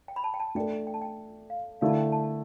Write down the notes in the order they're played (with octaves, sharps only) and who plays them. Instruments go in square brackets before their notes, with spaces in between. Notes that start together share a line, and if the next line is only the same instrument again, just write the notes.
[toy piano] G5
B5
A5
G5
A5
[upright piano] A3 D4 A4 [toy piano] G5
[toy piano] G5
A5
G5
F5
[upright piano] D3 A3 E4 [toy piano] F5
[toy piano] A5
G5
A5